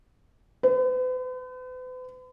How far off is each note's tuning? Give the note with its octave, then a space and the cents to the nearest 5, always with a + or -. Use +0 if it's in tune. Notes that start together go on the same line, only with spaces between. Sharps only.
B4 +45